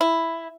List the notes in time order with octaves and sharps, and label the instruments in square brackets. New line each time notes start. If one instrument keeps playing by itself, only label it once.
[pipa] E4